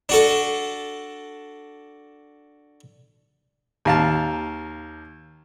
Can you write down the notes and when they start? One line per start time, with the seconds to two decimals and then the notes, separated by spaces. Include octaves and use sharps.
0.09 D4 F#4 A4
3.85 D#2 F5 A5